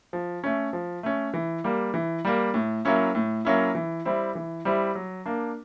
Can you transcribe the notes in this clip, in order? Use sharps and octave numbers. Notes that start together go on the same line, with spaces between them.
F3
A3 C#4
F3
A3 C#4
E3
G3 A#3
E3
G3 A#3
A2
F#3 A#3 C#4 E4
A2
F#3 A#3 C#4 E4
E3
G3 C4 E4
E3
G3 C4 E4
F#3
A#3 D4